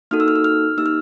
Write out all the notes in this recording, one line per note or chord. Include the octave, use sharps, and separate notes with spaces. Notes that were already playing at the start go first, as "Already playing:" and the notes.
A#3 D#4 F#4 A4 F6
E6
F6
E6
F6
A#3 D#4 G4 E6
F6